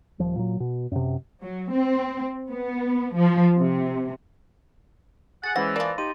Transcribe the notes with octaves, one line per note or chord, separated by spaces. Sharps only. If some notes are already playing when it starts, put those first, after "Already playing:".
D#1 F3
A#2 F#3
B2
F#2 C3
F#3
C4
B3
F3
C3
G#4 F#5 A6
E3 G#3 C#4 C5 F#5 A#6
F3 A#3 D5
D#4 G4 C6 D#7